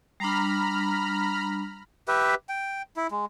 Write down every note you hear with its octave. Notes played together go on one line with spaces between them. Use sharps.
G3 D4 A#5 B5 F6
G4 B4 E5
G5
E4
G#3